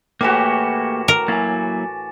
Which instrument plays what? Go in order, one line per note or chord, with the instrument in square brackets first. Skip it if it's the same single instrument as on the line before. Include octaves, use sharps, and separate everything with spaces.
[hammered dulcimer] A2 E3 F#4 [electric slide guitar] A#3 G4 [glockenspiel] D6 E7
[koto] A#4
[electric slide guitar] F#3 A#3 E4 [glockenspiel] G#5 A6